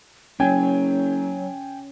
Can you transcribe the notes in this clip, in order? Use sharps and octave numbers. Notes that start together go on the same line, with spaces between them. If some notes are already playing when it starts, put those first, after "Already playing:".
F#1 F#3 C#4 G5 G#5 G#6